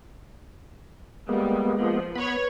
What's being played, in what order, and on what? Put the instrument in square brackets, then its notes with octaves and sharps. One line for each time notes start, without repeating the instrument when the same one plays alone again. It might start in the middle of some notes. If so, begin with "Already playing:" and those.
[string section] G3 [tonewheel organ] G#3 A#3 B3
[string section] F3
[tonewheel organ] B3 B5 [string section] B4 C#5